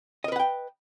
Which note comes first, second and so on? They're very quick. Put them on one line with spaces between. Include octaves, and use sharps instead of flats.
D#5 A#4 B4 F#5 G5